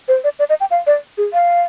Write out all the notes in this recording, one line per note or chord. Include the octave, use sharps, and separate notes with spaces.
C5
D5
D5
D#5
G5
F5
D5
G#4
F5